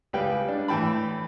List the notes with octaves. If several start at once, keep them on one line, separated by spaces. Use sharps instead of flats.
C#2 G3 B4 G5
D4
A2 E3 G5 A5 B5